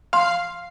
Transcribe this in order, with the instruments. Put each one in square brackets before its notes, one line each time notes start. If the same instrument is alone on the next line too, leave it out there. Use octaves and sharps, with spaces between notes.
[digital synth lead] F5 [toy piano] C6